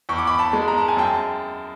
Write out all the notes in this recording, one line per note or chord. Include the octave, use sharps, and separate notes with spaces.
E2 C#6
D6
B5 C#6
A5 B5
G#3
A#5
A5
G#5
F#2 G5 A5